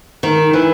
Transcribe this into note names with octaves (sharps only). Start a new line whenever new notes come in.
D#3
E3